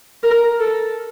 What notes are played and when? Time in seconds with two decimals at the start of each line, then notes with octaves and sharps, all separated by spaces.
0.23 A#4
0.60 A4